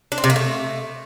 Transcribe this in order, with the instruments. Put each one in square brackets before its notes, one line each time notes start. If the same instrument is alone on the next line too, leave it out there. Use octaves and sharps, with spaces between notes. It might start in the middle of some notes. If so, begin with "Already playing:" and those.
[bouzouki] D4
C4
C3
A#3
A3